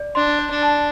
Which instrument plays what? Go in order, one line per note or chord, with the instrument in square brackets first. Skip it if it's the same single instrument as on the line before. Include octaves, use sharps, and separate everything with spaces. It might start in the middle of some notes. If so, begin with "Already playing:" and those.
Already playing: [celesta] D5
[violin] D4 [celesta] C6
[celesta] D5
[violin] D4
[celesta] A5